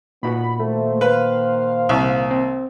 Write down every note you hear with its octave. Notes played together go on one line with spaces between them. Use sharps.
A#2 B3 D#4 F#4 B5
D#3 A3 A#3 C5
B4 F5
C2
C4